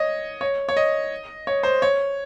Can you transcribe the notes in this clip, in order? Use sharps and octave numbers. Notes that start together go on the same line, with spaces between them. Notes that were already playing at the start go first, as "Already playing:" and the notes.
Already playing: C#5 D#5
C#5
C#5
D#5
C#5
C5
C#5